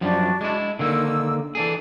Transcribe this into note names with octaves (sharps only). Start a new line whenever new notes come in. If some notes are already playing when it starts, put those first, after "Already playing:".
F#2 F3 G3 D4 F#4
G#3 E4
D3 D#3 A#3 E6
E3 D4 G#4 A4